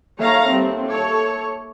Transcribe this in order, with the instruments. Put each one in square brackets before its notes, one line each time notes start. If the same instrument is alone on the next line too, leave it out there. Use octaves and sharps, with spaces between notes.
[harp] D#2 A4 E5 [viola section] C#5 F5 A#5
[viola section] G3 C4
[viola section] A4 C#5 [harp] D6